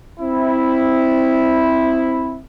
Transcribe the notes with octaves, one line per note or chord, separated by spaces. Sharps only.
C4 E4